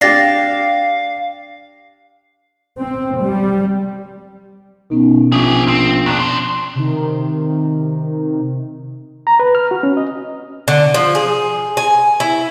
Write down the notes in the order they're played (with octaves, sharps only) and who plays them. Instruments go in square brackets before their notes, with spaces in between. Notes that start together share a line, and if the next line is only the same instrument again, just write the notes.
[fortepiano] D4 G4 [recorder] F5 [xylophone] A6 A#6 C7
[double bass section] C4
G3
[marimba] B2 B3 C#4 [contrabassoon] D#3
[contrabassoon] A#1 [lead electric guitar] G4 G#4 [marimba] E5 C#6
[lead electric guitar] C4
[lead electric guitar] D#2 D4 [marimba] F#6
[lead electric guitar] D4 C5
[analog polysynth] C3 D#3
[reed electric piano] A#5
B4
F6
F#4
C#4
D#5
[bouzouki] D3
F3
G#4
G#5
E4